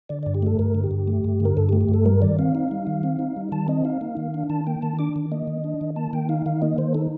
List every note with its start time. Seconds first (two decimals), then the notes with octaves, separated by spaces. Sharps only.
0.09 D3 D5
0.23 G2 D5
0.35 G4
0.42 A3 A4
0.59 G2 A#4
0.75 D3
0.84 G4
0.91 G2
1.08 A3
1.24 G2
1.40 D3
1.45 A#4
1.57 G2 A4
1.69 G4
1.73 A3
1.81 G4
1.89 G2
1.94 A4
2.06 G3 A#4
2.22 D#3 D5
2.39 C4 F5
2.55 D#4
2.71 G3
2.87 D#3
3.03 C4
3.19 D#4
3.36 G3
3.52 D#3 A5
3.68 C4 D#5
3.85 D#4 F5
4.01 A#3
4.17 D#3
4.34 D4
4.50 D#3 A5
4.67 A#3 G5
4.82 D#3 A5
4.99 D4 D6
5.16 D#3
5.32 A#3 D#5
5.47 D#3
5.64 D4
5.81 D#3
5.96 A#3 A5
6.13 D#3 G5
6.29 D#4 F5
6.46 D#3 F5
6.62 A#3 D#5
6.78 D#3 C5
6.94 D#4 A4